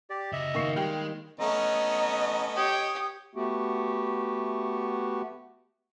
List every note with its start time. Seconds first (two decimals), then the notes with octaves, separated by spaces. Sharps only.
0.10 G4 D5
0.33 C#3 F#4 D#5 E5
0.55 D#3 A#3 C#6 C7 C#7
0.76 G3 G#3 G5 F6
1.40 A3 B3 C#4 D#5 A#5
2.56 G4 C#5 D#6
3.35 A3 B3 F#4 G4